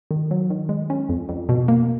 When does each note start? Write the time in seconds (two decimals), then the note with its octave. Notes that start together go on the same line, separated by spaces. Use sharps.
0.11 D#3
0.31 F#3
0.50 D#3
0.69 G#3
0.90 C#4
1.09 F2
1.29 F2
1.49 B2
1.68 A#3